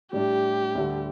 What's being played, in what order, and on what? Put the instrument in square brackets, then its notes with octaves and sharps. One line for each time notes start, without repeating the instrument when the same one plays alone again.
[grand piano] A2 G3 D4 [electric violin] G4
[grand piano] D2 D3 G3